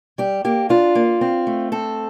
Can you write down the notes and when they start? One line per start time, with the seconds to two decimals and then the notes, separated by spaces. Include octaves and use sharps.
0.18 G3 G4
0.45 A#3 G4
0.69 D4 F4
0.95 A#3
1.21 C4
1.47 A3
1.72 C4 A4